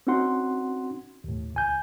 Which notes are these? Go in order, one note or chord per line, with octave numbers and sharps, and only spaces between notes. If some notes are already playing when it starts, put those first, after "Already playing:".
C4 C#4 D#4 F#4 F#5 C6
D#2 A2
C#2 G#5 G6